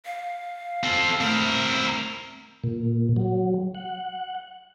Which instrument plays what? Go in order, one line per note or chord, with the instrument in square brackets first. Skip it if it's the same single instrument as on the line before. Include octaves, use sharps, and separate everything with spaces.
[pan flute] F5
[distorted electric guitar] C4 A4
[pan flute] A3 [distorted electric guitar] C4 A#4
[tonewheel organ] A#2
F#3
F#5